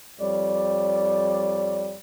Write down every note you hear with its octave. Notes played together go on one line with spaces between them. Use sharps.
F2 G3 C#5 D5